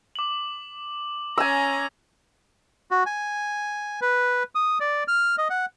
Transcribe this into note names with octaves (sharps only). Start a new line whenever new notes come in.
D6 F#7
C#4 G#5 A#5 E6
F#4
G#5
B4
D#6
D5
F6
D#5
F#5